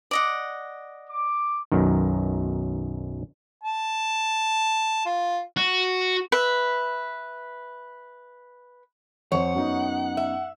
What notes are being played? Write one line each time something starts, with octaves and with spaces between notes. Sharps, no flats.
D5 D#5 F#5
D6
B1 F#2 D#3
A5
F4
F#4
B4 E5
F2 C5 C#5 F#5
F#2 B3 D#4
E5